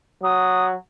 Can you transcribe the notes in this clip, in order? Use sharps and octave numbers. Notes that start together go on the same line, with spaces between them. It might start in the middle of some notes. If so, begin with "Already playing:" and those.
F#3 D#6